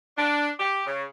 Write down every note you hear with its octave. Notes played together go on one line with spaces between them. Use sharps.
D4
G4
C#3